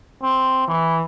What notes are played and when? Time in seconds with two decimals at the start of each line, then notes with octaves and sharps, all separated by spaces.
0.22 C4
0.67 E3